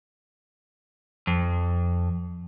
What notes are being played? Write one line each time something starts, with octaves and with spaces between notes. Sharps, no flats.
F2